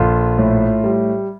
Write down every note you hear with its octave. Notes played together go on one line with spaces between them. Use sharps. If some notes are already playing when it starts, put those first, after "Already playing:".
Already playing: A#1 F4 A4
A2
G3